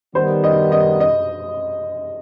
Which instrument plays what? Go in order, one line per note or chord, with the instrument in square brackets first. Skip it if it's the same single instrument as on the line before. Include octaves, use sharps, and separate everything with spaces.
[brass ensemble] D#3 G3 B3 [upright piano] C5
[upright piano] D#5
D#5
D#5